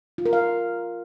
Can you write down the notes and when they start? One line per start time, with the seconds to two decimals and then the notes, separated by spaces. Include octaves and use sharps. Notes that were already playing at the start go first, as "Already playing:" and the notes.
0.18 F4
0.26 A#4
0.33 F5